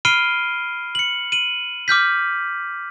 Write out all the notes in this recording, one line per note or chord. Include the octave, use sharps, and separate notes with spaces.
B5 F6 C7 D7 D#7 G7
C#7 F#7
D#7 F#7
D6 F6 G6 B6